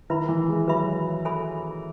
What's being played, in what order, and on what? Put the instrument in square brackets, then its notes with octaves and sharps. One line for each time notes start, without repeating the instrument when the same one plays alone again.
[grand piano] D#3 [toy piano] E4 B4 E5 B5
[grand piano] E3
G#3
[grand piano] F#3 [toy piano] B4 E5 B5
[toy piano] A4 E5 G#5 B5